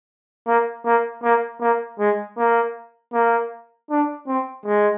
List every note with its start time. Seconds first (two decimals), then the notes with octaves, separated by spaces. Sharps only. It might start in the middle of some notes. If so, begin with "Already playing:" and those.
0.46 A#3
0.85 A#3
1.23 A#3
1.60 A#3
1.99 G#3
2.37 A#3
3.13 A#3
3.91 D4
4.28 C4
4.66 G#3